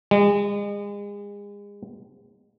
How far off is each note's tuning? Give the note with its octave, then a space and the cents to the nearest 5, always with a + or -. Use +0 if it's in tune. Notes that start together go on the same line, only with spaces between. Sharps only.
G#3 -35